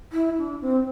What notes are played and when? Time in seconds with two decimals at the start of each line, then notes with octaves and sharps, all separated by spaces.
0.12 E4
0.38 D4
0.61 C4